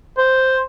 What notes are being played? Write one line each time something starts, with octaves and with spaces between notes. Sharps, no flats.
C5